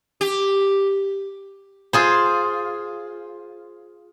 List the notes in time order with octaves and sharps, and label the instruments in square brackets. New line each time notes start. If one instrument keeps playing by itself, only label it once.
[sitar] G4
[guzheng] F4 G#4 C5